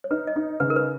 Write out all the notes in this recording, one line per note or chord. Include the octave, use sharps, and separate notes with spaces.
C#5
D#4 B4
D#5
D#4
C#3 B4
A#4
B4